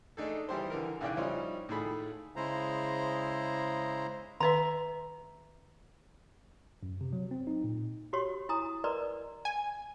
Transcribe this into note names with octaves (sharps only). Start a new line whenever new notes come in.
A3 D4 D#4 G#4 A4
E3 G3 E4 G4 G#4 C5
D3 E3 A#4
B1 C#3 E3 D5 G5 F#6
F3 G3 C#4 D#4 E4 C5
A2 D#3 F4 G#4 A4 B5
C#3 G#3 E4 C5 A#5
D#3 B4 E5 A#5
F#2
C3
F#3
C4
D#4
A#2
F#4 G4 C#5 C6
E4 G#5 A#5 D#6
A#4 B4 D5 D#5 A#5 C6
G#5